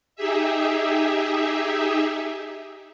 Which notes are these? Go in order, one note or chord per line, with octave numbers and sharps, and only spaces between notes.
D#4 G4 G#4 E5